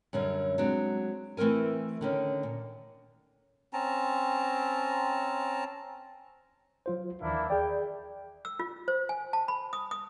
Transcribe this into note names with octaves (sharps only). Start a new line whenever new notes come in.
F#2 D3 G3 C#4
F#3 G#3 C4 D4
E3 A3 C4 A#4 G#5
D3 D#3 C#4
A#2
C4 C#4 A5 A#5
F#3 F4 C5
D#2 D#3 E3 A#3 D4 E4
G#4 D5 G5
E6
F4
C5
G#5
A5
B5
D#6
D#6